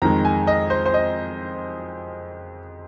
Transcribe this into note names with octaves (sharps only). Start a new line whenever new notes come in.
F2 D#3 G#3 A#5
G#5
D#5
C5
C5
D#5